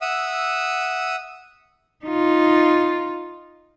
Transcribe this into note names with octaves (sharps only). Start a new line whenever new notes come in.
E5 F#5 D#6 E6
D#4 F4